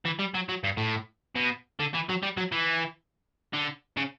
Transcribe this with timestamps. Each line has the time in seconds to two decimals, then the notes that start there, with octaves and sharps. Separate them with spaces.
0.05 E3
0.19 G3
0.35 F#3
0.49 F#3
0.64 G2
0.77 A2
1.35 B2
1.80 D3
1.94 E3
2.09 F#3
2.23 G3
2.37 F#3
2.52 E3
3.54 D3
3.97 C#3